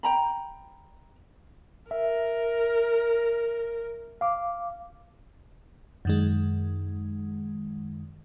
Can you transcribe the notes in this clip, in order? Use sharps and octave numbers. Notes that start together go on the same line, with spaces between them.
G5 A#5 B5
A#4 E5
F5 D6
F#2 D#3 G#3